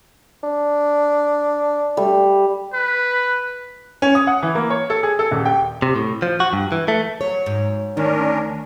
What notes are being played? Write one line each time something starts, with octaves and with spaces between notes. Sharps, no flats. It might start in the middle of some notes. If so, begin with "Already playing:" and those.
D4
G3 A3
B4
C#4
D#6
F#5
E3
A#3
C#5
A4
G#4
A4
D#1
G5
C3
A2
F3
F#4
G2
E3
A3
F#3 C#5
G#2
D2 D#3 C#4 D4 A#4